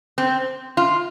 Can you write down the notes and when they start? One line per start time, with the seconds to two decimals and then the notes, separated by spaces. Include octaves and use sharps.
0.18 C4
0.77 F4